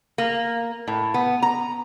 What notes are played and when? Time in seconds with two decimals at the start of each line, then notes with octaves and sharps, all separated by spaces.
0.18 A#3
0.88 A2
1.14 B3
1.42 A#5